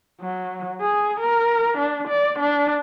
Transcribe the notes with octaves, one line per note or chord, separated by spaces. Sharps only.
F#3
G#4
A#4
D4
D5
D4